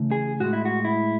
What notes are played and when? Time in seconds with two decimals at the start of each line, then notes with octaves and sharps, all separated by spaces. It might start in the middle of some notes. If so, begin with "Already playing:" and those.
Already playing: C#3 E3 A3
0.11 G#4
0.40 A2 G#3 F#4
0.53 E4
0.65 F#4
0.85 E4